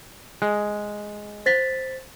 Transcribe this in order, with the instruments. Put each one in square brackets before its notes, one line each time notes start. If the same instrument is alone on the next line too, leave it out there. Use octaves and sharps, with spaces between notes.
[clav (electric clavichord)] G#3
[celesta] C5 A6 B6